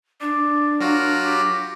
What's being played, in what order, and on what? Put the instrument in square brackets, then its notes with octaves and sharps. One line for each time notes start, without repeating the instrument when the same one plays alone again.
[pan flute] D4 [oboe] D5
[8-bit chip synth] F#3 F4 F#4 [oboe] A#4
[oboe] G4